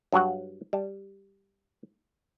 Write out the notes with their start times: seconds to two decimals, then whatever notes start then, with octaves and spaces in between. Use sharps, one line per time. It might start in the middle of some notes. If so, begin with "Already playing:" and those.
0.12 G2 F#3 F#4 F#5
0.73 G3 A5